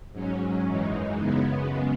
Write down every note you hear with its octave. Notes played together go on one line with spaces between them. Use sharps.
G#2 F#3 C#4
F#2 E3 G#3 D#4
F#2 C#3 G#3 B3